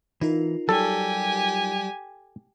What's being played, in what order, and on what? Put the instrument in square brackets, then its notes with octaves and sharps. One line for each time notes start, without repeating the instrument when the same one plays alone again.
[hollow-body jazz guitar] E3 [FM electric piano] D#4 F4 A#4
[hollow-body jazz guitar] F#3 G3 [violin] G4 G#5 [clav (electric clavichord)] A4